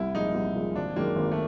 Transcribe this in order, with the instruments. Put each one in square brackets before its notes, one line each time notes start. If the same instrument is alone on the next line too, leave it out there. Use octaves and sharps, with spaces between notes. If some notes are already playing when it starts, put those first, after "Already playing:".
Already playing: [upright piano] C2 [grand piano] E4
[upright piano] A#2 F3 G#3 [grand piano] D#4
[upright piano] C2
A#2 F3 G#3
[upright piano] G#1 [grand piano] D4
[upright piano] F#2 D#3 G#3 [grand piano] A#3
[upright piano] G#1
[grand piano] A3